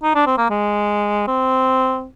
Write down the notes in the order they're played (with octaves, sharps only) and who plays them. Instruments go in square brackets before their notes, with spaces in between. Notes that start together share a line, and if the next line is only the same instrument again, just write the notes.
[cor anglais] D#4
D4
C4
A#3
G#3
C4